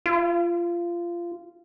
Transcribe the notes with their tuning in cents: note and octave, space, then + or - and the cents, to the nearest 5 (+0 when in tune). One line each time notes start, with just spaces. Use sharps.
F4 -20